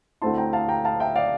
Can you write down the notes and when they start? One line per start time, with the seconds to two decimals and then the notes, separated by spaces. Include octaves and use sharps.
0.21 D2 D3 A3 C4 E4 A5 C6
0.38 G5 A#5
0.53 F5 A5
0.69 G5 A#5
0.85 F5 A5
1.00 E5 G5
1.16 D5 F5